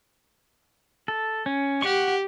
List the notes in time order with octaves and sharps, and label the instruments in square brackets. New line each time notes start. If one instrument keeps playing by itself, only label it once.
[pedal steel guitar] A4
C#4
[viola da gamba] G4 [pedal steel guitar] F#5 C#6